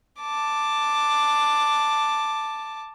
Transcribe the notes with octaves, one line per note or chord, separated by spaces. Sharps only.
A5 D6